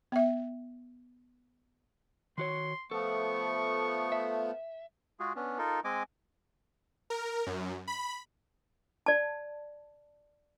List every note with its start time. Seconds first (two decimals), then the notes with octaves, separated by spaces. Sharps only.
0.12 B3 E5
2.38 D#3 F#4 C#5 C6
2.91 F3 A3 B3 A4 C#6
4.12 E5
5.20 G#3 F4 F#4 G#4
5.36 B3 C#4 D4
5.58 D#4 F4 A4 A#4
5.84 G#3 C4 D#5 G#5 D6
7.10 A#4
7.47 F#2
7.87 B5
9.06 D5 A5